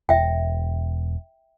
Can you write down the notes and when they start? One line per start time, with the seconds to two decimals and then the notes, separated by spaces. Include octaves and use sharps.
0.09 E1 E5 G5